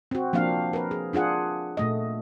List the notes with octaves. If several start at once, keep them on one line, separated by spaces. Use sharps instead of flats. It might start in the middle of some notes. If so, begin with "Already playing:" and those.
C4 F#4
F3 A#3 C4 D4 F5
A#4 B4
G#4
D4 F4 G#4 F#5
A#2 A3 D#5